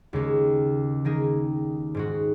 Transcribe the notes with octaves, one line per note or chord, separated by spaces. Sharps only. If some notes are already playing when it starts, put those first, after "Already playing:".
D#2 C#3 G#3 C#4
D#3 A#3 D#4 G#4
G#2 G#3 F#4